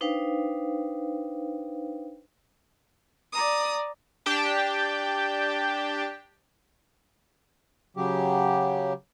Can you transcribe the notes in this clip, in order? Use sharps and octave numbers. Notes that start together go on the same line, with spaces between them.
D4 D#4 B4 C5 F5 G5
D5 A#5 D#6
D4 G4 G5 A5
C#3 F#3 G4